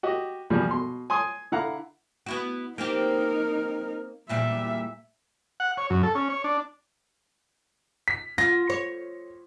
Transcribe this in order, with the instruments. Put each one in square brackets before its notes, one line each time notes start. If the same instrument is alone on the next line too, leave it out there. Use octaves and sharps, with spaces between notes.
[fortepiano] F#4 G4 D#5
E2 B2 F3 G3
B2 C6
G#5 C6 D#6
D3 E4 F5 F#5 A#5
[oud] B3 E4 F#4
[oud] A#3 C4 G4 [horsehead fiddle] D#4 A#4
[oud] E2 A#2 G3 [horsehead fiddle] E5
[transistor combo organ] F#5
C#5
F#2
A4
C#4
C#5
D4
[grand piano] B6
[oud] F4 [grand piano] A#6
[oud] C#5